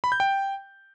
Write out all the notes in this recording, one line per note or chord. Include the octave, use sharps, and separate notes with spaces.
B5
G6
G5